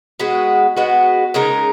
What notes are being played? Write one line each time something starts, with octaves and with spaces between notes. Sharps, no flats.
G#3 B3 F#4
G#3 B3 F#4
C#3 G#3 D#4 A#4